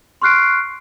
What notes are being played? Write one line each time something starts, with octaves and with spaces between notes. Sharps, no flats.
C6 C#6 F6 F#6 C7 D7